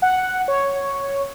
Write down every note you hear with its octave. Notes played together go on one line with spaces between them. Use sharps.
F#5
C#5